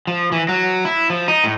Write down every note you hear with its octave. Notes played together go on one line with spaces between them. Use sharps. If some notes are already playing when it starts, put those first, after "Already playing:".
F3
E3
F#3
E4
F3
D#4
A2